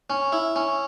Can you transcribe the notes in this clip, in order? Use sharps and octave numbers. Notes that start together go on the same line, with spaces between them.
C#4
E4
C#4